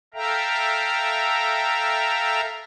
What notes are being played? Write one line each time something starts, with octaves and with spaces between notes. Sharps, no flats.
A4 E5 F5 G5 A#5